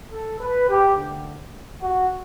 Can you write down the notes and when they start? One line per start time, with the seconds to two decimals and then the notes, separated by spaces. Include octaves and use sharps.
0.12 A4
0.41 B4
0.69 G4
0.97 D2 D3
1.82 F#4